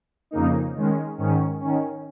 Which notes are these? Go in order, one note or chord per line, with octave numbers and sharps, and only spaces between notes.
F2 C#3 A#3 D#4
D#3 G#3 C#4
G#2 D#3 C#4
D#3 C#4